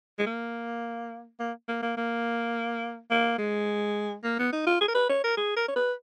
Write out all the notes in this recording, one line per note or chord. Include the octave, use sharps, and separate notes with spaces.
G#3
A#3
A#3
A#3
A#3
A#3
A#3
G#3
A#3
B3
D#4
F4
G#4
A#4
B4
C#5
A#4
G#4
A#4
C#5
B4